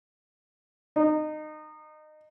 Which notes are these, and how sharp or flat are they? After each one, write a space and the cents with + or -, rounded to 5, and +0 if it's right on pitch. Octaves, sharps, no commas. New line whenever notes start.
D#4 -25